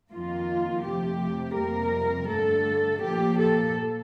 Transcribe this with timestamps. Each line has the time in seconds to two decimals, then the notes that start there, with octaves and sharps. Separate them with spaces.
0.11 F2 D#3 A#3 F4
0.84 F2 C3 F3 A3 G4
1.55 F2 C3 G3 A#3 A#4
2.28 G2 D3 A3 A4
3.00 A#2 F3 A#3 G4
3.38 A4